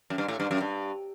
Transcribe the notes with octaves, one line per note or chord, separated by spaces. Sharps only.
F#2
G2
A2
G2
F#2
G2